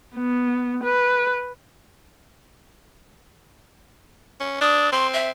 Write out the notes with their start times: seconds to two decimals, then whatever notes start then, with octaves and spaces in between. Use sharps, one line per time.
0.15 B3
0.84 B4
4.40 C#4
4.61 D4 D#6
4.92 C4 C6
5.13 E5